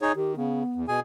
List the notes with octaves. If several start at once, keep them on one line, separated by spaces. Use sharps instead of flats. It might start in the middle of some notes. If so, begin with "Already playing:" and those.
D#4 G#4 C#5
D#3 G4
C#3 B3
E2
B2 G#4 G#5